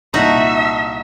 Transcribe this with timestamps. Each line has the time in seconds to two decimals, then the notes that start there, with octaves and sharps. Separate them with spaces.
0.14 C2 A#2 D#4 F#4 E5 A5